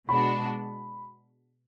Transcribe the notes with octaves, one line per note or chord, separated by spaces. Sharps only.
B2 G#3 D4 F#4 B5